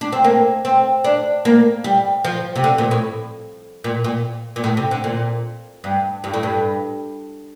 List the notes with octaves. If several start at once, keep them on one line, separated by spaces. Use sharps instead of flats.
D4
C4
A#3
C4
D4
A#3
G3
F3
C3
D3
A#2
A2
A#2
A#2
A#2
A2
C3
D3
A#2
G2
G2
A2
G2